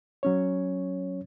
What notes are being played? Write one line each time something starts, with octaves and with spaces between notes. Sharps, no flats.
F#3 C#4 C#5